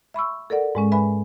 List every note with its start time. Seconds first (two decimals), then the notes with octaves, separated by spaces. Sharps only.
0.14 E5 B5 C#6 E6
0.50 A4 A#4 D5 F#5
0.75 G#2 G#3 C#4
0.92 B4 E5 G#5 B5